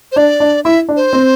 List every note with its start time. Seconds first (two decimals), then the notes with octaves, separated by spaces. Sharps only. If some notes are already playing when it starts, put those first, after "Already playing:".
0.12 C5
0.16 D4 D5
0.40 D4
0.65 E4 E5
0.89 D4
0.96 C5
1.13 C4